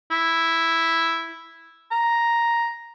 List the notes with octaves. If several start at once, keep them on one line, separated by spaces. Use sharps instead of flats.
E4
A#5